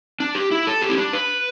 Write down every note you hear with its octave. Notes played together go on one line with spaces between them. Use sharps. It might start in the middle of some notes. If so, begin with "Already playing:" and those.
D4
G4
E4
A4
G4
E4
D4
B4